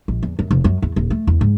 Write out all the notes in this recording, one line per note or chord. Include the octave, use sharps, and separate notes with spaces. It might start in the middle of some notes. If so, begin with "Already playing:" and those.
A#1
E2
F#2
F1
F#2
E2
D#1
A3
E2
G#2